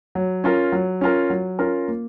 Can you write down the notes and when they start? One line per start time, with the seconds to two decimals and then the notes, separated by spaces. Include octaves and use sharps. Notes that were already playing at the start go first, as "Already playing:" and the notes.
0.15 F#3
0.44 C#4 F4 A#4
0.72 F#3
1.01 C#4 F4 A#4
1.30 F#3
1.59 C#4 F4 A#4
1.88 A#3